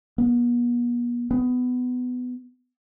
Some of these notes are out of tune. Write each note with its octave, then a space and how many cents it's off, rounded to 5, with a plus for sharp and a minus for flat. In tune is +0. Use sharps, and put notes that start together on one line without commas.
B3 -45
B3 +15